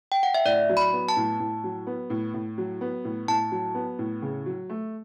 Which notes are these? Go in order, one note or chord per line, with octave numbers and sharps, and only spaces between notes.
G5
F#5
E5
A2 D5
F#3
B5
B3
A5
A2
A2
F#3
B3
A2
A2
F#3
B3
A2
A2 A5
F#3
B3
A2
C#3
F#3
A3